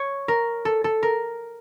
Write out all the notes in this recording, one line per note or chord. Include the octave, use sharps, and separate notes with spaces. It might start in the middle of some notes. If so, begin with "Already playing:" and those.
Already playing: C#5
A#4
A4
A4
A#4